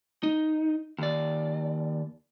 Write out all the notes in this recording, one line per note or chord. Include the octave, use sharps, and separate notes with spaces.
D#4
D#2 D5